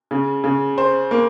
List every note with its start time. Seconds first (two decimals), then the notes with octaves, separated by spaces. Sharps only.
0.11 C#3
0.44 C#3
0.78 C5
1.11 A#3